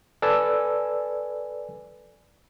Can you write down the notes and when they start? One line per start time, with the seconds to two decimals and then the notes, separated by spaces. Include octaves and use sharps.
0.22 A4 B4 D5 G#5 E6